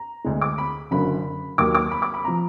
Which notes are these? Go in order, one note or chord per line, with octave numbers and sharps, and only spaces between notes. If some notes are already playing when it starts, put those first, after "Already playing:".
Already playing: A#5
D2 D3 G#3
D6
B5
F#1 F#2 D3 F#3 B5
D#2 D#3 F#3 A#3 D6
D6
B5
D6
B5
F3 A#5